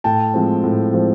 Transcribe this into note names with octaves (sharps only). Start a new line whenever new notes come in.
A2 G5 A5
F3 G#3 C4
A2
F3 G#3 C4